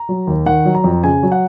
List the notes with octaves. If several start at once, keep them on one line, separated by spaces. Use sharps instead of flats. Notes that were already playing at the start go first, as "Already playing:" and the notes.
Already playing: A#5
F#3
D#2
D#3 F#5
F#3
A#5
F2
C#3 G#5
F#3
F#5